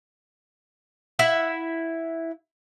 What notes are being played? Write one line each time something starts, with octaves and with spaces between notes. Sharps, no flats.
E4 E5 F#5